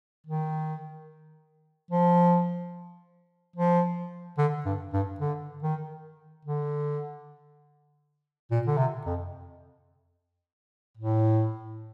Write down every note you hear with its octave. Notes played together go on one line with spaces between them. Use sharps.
D#3
F3
F3
D3
G2
G2
D3
D#3
D3
A#2
D3
C3
F2
A2